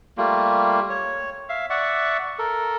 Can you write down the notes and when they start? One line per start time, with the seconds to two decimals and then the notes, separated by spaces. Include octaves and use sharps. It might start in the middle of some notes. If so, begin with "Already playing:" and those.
0.18 G3 A3 A#3 F4
0.89 C#5
1.49 E5 F5
1.70 D5 E5 F#5 C#6
2.39 A4 A#4